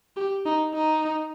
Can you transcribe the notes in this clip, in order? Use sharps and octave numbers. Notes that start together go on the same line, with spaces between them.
G4
D#4
D#4